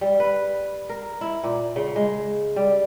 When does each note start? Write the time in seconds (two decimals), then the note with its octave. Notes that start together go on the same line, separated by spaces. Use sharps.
0.01 G3
0.20 B4
0.89 A#4
1.21 E4
1.43 A#2
1.76 C#3
1.96 G#3
2.56 G3